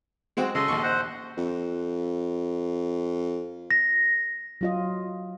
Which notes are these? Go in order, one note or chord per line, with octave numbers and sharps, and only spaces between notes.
G#3 C4 F#4
C#3 A4 D#5 C6
A#1 D#2 C#6
C5 F#5
F2
A#6
F#3 F4 D#5